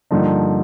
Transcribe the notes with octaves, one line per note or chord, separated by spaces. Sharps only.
G2 D3 F3 A#3 D#4